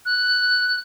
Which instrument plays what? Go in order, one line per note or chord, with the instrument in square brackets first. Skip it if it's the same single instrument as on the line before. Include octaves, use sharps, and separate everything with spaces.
[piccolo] F#6